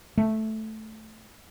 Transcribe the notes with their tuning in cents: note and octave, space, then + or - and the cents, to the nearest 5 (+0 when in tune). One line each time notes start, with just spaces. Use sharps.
A3 -5